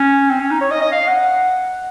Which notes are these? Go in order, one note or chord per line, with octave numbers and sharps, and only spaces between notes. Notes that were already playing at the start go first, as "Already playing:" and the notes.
Already playing: C#4
C4
C#4
D#4
C#5
D#5
D#5
F5
F#5